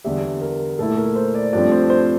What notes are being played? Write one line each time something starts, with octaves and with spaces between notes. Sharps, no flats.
E2 D3 G3 E5
A#4
A#2 A3 E4 A4
A#4
C5
D5
G2 F3 A3 C4 D5
C5
C5